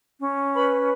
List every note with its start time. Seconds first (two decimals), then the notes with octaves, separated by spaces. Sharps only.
0.21 C#4
0.54 B4 B5